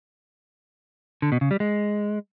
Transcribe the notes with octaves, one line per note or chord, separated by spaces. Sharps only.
D3
B2
C#3
G3
G#3